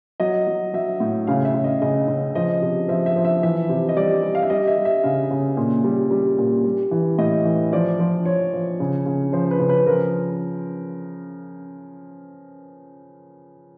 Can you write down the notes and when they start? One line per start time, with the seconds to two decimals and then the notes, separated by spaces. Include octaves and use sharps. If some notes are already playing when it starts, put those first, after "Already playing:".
0.20 F#3 D#5
0.47 F#3
0.73 F#3 E5
1.00 A2
1.27 C#3 F5
1.45 E5
1.54 C#3
1.64 D#5
1.82 C#3 D#5
2.08 C#3
2.35 F3 D#5
2.62 C3
2.88 F3 E5
3.06 E5
3.16 F3
3.25 E5
3.42 E3 E5
3.69 C3
3.89 D#5
3.97 G3 D5
4.23 G3
4.35 F5
4.42 E5
4.50 G3 D#5
4.67 E5
4.77 G3
4.85 E5
5.03 C#3 F5
5.31 C#3
5.57 A#2
5.84 G3
6.11 G3
6.38 A#2
6.64 G3
6.91 E3
7.18 A2 D#5
7.45 E3
7.73 F3 D5
7.99 F3
8.25 F3 C#5
8.53 F3
8.80 C#3
9.06 C#3
9.33 F3 C5
9.51 B4
9.60 C#3
9.69 B4
9.87 F3 A#4